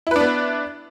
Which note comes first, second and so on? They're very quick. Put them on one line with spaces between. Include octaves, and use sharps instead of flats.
E4 B4 D4 B3